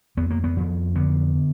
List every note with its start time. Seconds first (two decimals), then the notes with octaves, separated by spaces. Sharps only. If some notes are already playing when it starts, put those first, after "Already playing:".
0.17 F2 B3
0.30 A#3
0.44 B3
0.57 F2
0.95 D3 B3